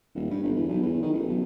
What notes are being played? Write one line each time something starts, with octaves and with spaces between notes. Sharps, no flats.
D#1
G2
G1
E2
B1
E2
D#3
A1
B1